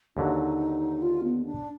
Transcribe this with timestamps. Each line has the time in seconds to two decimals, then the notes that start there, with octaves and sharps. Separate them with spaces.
0.16 D#2 D3 F#3 D#4
1.02 F4
1.23 B3
1.45 D4